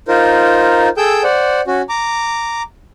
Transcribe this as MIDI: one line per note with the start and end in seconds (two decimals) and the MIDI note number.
0.08 0.89 63
0.08 0.89 65
0.08 0.89 70
0.08 0.89 72
0.97 1.23 68
0.97 1.23 69
0.97 1.23 79
0.97 1.23 88
0.97 1.23 91
1.23 1.61 72
1.23 1.61 74
1.23 1.61 78
1.67 1.82 61
1.67 1.82 66
1.89 2.62 82
1.89 2.62 86